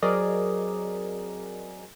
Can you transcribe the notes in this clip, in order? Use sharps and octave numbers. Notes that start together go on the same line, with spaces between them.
F#3 C4 G#4 A#4 D5 D#5